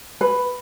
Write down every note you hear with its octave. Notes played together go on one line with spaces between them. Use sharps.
B4